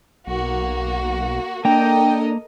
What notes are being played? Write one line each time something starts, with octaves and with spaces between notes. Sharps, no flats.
B1 A#3 F#4
A#3 D4 A4 A#4 D#5 G5 A#5